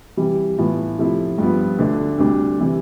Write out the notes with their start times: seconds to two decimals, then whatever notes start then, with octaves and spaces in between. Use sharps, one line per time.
0.17 C3 E3 G3
0.58 A2 E3 B3 F4
0.98 C3 F3 A3 E4
1.38 G2 F3 B3
1.78 D2 D3 A3 D4
2.18 D2 C3 G3 D4
2.59 C3 E3